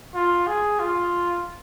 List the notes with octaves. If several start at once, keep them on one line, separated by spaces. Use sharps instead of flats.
F4
G#4
F4